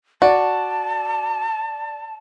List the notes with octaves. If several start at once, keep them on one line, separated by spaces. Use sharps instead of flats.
F#4 D5 A5